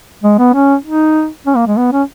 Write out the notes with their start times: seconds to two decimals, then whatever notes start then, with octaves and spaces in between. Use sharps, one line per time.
0.23 G#3
0.39 B3
0.54 C#4
0.85 D#4
1.46 C#4
1.56 A#3
1.67 G#3
1.77 B3
1.92 C#4